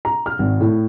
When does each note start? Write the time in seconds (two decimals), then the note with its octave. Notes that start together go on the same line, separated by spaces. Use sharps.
0.05 A#5
0.26 F6
0.39 G#1
0.60 A2